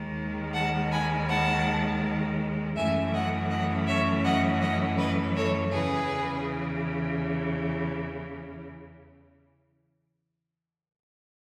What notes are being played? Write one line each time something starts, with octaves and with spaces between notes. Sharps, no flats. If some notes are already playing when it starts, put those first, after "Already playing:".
Already playing: D#2 D#3 G#3
F#5 A5
G#5 B5
F#5 A5
F#2 E3 A3 C#4 E5 G#5
D#5 F#5
D#5 F#5
C#5 E5
D#5 F#5
D#5 F#5
B4 D#5
A4 C#5
E2 C#3 E3 G#4 B4